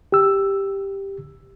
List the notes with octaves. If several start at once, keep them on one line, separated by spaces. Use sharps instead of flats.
G4 E6